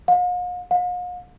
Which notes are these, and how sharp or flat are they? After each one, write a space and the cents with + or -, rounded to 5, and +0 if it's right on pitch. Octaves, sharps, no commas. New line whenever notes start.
F5 +45
F5 +45